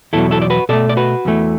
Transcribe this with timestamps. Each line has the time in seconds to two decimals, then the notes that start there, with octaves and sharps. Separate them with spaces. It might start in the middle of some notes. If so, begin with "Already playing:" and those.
0.13 E2 B2 F#3 E4 A4
0.31 E4 A4
0.42 D5
0.50 F#4 B4
0.69 B2 A3 A4 D5
0.89 D5
0.97 F#4 B4
1.25 E2 E3 A3